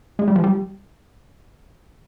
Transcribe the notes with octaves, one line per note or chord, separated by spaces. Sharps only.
G#3
G3
F3
G3